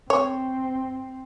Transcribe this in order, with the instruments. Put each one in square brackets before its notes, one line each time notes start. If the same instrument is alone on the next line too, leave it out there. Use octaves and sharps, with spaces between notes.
[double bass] C4 [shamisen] C#5